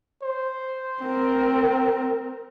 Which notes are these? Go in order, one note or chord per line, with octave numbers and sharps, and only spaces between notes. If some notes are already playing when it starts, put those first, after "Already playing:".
C5
C4 A#4